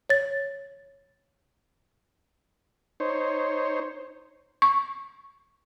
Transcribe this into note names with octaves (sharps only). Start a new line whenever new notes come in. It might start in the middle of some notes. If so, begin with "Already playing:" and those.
C#5 A6
D#4 C5 C#5
C#6